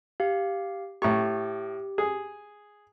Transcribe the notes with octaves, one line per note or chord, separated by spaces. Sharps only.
G4 F5
A2 G4 C#6
G#4